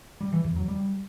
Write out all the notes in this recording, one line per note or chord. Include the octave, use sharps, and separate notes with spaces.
G3
E3
E2
F#3
G3